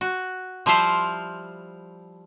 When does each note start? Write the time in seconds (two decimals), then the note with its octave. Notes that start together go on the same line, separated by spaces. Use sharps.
0.01 F#4
0.66 F3 G3 E4 C5 F5